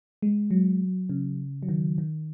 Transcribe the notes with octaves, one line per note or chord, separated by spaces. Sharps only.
G#3
F#3
C#3
F#3
D#3
D#3